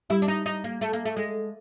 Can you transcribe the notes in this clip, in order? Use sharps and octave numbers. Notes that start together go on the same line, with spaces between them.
G3 E4 G4
D4
D#4
D#4
A#3
A3
A#3
A3
G#3